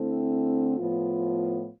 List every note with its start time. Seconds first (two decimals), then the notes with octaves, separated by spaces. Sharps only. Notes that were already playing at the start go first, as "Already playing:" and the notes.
Already playing: D3 A3 C4 E4
0.77 A2 F3 B3 F4